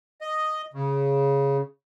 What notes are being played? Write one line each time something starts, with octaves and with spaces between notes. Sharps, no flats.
D#5
C#3